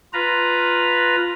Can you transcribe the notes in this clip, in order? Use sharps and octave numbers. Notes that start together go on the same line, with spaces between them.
F4 B4 A#5